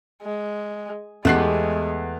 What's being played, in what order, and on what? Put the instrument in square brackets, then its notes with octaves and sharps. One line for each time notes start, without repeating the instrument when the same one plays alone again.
[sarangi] G#3
[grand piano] E2 F#6 C7 [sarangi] G#3 [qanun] A3 B3 G4